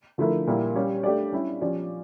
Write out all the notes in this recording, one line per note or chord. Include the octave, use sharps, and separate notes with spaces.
D3 F3 A3 E4 A#4
A#2 G3 A#3 E4
G3 C#4 G4 C#5
A3 D4 G4 D5
G3 C#4 E4
F3 C#4 G4 D5